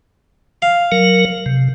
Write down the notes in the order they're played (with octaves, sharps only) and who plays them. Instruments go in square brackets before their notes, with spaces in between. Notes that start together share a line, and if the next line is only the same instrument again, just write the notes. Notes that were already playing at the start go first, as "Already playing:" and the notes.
[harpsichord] F5
[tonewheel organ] F#3 A#4
C3